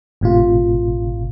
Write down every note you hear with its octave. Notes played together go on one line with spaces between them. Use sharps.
G#1 A2 C3 F4